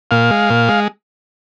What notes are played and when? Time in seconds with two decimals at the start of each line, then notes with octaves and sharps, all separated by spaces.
0.11 A#2 F5
0.31 G#3
0.50 A#2
0.68 G#3